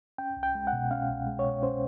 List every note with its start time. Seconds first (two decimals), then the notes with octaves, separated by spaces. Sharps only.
0.18 C#4 G5
0.37 C2
0.43 G5
0.55 G#3
0.67 F#5
0.73 B2
0.91 C#4 F5
1.10 C2
1.27 G#3
1.39 C#5
1.45 B2
1.63 C#4 C5